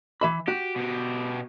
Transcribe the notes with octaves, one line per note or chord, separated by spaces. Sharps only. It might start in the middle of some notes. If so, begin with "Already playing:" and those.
E3 E5 B5
F#4 G4
B2 G4